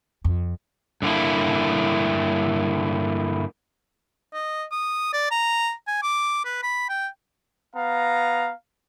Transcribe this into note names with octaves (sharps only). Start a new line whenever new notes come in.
F2
G2 D3 A#3 E4
D#5
D#6
D5
A#5
G#5
D6
B4
B5
G5
B3 F5 A#5